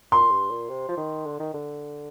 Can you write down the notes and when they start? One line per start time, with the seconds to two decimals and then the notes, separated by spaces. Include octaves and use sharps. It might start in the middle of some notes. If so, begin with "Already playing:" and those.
0.11 A#2 C6
0.31 G2
0.50 A#2
0.69 C3
0.89 F3
0.97 D#3
1.26 D3
1.40 D#3
1.54 D3